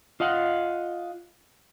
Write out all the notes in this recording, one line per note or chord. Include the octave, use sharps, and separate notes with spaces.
F4 D#5 F5 F#5